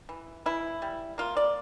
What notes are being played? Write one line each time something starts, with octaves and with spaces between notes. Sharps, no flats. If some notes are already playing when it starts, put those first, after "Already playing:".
E3
E3 E4
G3
A#3 F4
D5